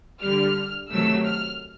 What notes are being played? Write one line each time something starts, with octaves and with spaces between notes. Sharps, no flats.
D3 G3 F6
C3 D#3 F#3 A3 E6
F6